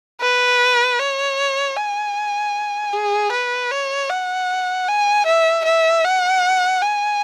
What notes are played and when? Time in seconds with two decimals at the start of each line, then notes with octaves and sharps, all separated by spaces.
0.21 B4
0.99 C#5
1.77 G#5
2.93 G#4
3.32 B4
3.71 C#5
4.10 F#5
4.88 G#5
5.26 E5
5.65 E5
6.05 F#5
6.82 G#5